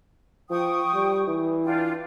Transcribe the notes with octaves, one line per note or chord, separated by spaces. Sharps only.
F3 G5 C#6 D#6
G3
E3
D4 F4 G5